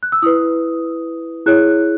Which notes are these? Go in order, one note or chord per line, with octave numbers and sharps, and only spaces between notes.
F#6
E6
E4 B4 D#6
E4 G#4 C#5 F#6